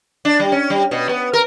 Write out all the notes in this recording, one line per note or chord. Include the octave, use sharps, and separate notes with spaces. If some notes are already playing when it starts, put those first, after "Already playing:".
D4
G3
C#4
G3
B2
B3
A#4